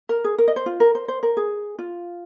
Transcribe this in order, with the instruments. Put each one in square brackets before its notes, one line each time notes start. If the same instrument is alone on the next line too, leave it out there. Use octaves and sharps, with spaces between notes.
[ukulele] A#4
G#4
A#4
D#5
C5
F4
A#4
C5
C5
A#4
G#4
F4